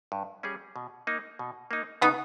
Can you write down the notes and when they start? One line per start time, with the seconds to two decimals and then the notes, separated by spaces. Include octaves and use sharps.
0.12 G2
0.43 G3 C#4 G#4
0.76 B2
1.07 A#3 D#4
1.39 B2
1.71 A#3 D#4
2.02 C#3 B3 D#4